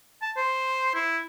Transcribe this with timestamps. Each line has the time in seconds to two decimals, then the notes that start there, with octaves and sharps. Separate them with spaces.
0.22 A5
0.37 C5
0.94 E4